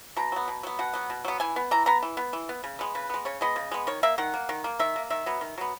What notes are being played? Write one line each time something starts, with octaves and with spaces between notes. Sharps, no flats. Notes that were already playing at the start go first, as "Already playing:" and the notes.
B2 A#5
F#3 B3
B2
F#3 B3
B2 F#5
F#3 B3
B2
F#3 B3
E3 G#5
B3
E3 A#5
B3 A#5
E3
B3
E3
B3
C#3
G#3 B3
C#3 B4
G#3 B3
C#3 C#5
G#3 B3 D#5
C#3
G#3 B3
D#3 C#5
A#3 E5
D#3 F#5
A#3
D#3
A#3
D#3 E5
A#3
D#3 E5
F#3 B3
D#3
F#3 B3